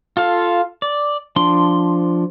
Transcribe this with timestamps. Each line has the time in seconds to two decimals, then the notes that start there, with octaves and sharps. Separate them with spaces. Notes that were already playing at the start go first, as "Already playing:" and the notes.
0.17 F4 A4 F5
0.82 D5
1.36 F3 D4 C6